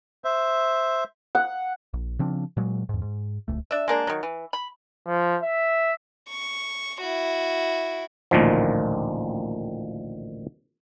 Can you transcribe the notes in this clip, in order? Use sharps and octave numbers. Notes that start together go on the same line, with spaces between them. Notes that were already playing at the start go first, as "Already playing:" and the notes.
C5 E5
F#5
A#1
C#3 F3 C4 D4
A#2 F#3 G#3
E2 G#2
G#2
D1 C#2 A3
D4 E5
G#3 A#3 D4
D#3 F#3
E3
B5
F3
E5
C#6
E4 F#4
A1 D2 A#2 D#3 F3